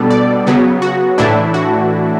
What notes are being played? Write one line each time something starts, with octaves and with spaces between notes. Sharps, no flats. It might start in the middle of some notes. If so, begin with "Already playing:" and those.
Already playing: B2 G3 B3 D4 A4
D5
C#3 F#3 B3
F#4
A2 E3 A3 D4 E4
F#4